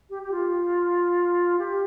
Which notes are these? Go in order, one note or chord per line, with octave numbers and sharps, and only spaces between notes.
G4
G4
F4
G4